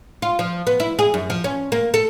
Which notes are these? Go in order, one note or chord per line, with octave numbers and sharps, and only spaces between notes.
F4
F3
B3
E4
G#4
F#2
F3
C#4
A#3
A4